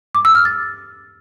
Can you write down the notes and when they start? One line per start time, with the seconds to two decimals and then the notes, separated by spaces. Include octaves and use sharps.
0.15 D6
0.25 E6
0.35 F6
0.45 A6